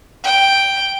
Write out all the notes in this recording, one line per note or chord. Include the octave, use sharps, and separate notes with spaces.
G5